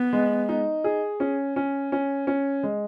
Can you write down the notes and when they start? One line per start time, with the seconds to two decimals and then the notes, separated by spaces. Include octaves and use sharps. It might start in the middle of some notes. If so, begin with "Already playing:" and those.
Already playing: B3
0.13 G#3
0.49 D#4
0.84 G#4
1.20 C#4
1.56 C#4
1.92 C#4
2.27 C#4
2.63 G#3